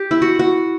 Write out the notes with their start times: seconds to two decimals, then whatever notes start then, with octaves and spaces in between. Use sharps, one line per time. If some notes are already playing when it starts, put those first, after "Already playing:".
Already playing: G4
0.11 E4
0.22 F#4
0.39 F#4